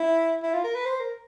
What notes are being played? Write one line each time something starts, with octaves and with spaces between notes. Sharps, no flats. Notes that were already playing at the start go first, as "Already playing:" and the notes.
Already playing: E4
E4
F4
A#4
B4
C5
A#4